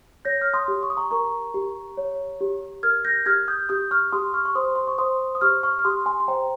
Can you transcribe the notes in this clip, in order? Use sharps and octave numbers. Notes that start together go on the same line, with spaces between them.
C#5 G6 A#6
F6
C6 D#6
G4
C#6
D#6
A#5 C#6
A#4 A#5 C#6
G4
C#5
G4
A#4 F6 G#6
G6 A#6
G4 F6 G#6
D#6 G6
G4 D#6 G6
C#6 F6
G4 C6 D#6
C#6 F6
C#6
C5 C6 D#6
C6
C#6
C5 C6 D#6
D#6
G4 C#6 F6
C#6 F6
F6
G4 C6 D#6
G#5 C6
C6
C5 G5 A#5